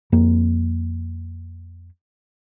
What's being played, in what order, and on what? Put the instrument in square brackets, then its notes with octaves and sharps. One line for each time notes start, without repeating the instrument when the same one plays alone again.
[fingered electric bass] F2 A#3